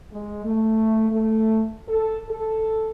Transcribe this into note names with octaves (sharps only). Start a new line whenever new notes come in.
G#3
A3
A3
A4
A4